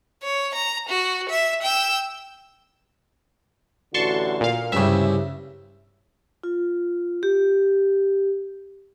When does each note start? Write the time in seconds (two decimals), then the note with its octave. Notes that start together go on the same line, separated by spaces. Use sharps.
0.23 C#5
0.55 A#5
0.89 F#4
1.29 E5
1.63 G5 E6
3.94 A1 D3 F#4 A5 C6 C#6
4.41 A#2 F5
4.72 C2 G2 C#3 G3 C#4 E5
6.43 F4
7.23 G4